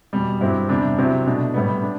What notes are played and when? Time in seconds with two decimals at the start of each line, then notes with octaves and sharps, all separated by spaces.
0.13 E2 B2 G3
0.41 G2 F#3 C4 E4
0.69 E2 C3 G3 D4
0.98 C3 F#3 C4 E4
1.26 B2 A3 D4
1.54 A2 G3 B3
1.83 D4